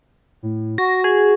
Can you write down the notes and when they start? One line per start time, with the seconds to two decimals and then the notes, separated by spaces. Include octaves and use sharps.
0.43 A2
0.78 F#4 A#6
1.04 G#4